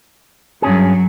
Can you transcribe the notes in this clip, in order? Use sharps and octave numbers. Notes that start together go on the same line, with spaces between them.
G2 F#3 C#4 G#4